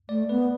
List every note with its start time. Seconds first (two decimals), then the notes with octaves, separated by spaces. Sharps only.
0.09 A3 D5
0.29 B3 B4